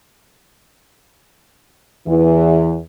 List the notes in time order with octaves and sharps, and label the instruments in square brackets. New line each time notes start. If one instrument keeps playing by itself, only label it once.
[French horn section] E2 E3